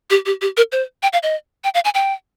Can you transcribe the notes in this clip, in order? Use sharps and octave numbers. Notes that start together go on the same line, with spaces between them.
G4
G4
G4
A#4
C5
G5
F5
D#5
G5
F5
G#5
G5